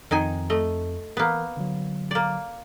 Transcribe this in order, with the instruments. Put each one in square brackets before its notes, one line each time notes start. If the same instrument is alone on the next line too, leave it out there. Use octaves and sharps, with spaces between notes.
[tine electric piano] F2 [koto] D#3 D#4 G#5
[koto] A3 D#5
[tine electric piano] E3 A#4 [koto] A#3 B3
[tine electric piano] D3 F#3
[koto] A#3 D5